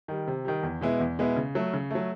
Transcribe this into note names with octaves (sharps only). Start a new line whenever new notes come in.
D#3 G3
C3
D#3 G3
E2
B2 G#3 B3 E4
E2
B2 G#3 B3 E4
C#3
F#3 A3
C#3
F#3 A3